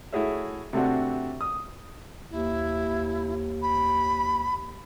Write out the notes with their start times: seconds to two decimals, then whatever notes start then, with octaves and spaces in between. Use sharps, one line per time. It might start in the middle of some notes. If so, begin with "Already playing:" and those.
0.12 A3 E4 F#4 G#4 C#5 E5
0.73 C3 A3 C4 D4 F#4
1.41 D#6
2.30 D#2 E4
3.62 B5